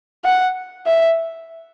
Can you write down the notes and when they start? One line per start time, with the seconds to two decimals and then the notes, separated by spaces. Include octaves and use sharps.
0.25 F#5
0.86 E5